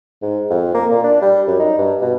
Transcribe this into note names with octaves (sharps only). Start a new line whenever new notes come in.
G#2
F2
A#3
A#2
D4
G3
F#2
D#4
G2
B2